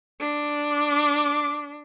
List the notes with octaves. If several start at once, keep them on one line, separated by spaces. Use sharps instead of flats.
D4
D6